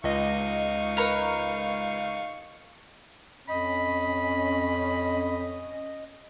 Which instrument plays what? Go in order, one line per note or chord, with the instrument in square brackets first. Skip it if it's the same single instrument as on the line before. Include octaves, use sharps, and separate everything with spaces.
[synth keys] C#2 D#5 [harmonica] D#4 F5 C#6
[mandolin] A#4 B4 C#5
[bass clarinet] F2 [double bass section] C#4 [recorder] D#5 [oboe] B5